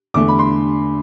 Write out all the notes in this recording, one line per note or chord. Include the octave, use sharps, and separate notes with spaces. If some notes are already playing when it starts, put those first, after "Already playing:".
E2 D3 A3 D6
B5
C6